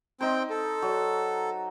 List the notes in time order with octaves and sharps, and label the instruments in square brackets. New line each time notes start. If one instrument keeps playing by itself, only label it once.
[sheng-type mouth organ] C4 G5 [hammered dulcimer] D#4 C5
[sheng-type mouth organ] A4
[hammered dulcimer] F#3